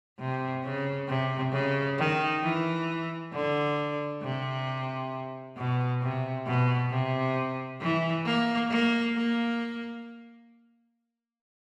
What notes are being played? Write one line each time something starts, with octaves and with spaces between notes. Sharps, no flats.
C3
C#3
C3
C#3
D#3
E3
D3
C3
B2
C3
B2
C3
E3
A#3
A#3
A#3